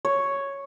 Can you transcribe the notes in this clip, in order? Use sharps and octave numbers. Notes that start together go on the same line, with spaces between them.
C#5